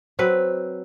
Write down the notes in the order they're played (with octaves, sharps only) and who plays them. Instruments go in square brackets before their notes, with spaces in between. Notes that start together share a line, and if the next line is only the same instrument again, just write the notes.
[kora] F#3 C4 B4